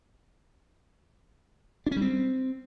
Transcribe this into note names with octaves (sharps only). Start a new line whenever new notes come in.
D4
C#4
G3
C4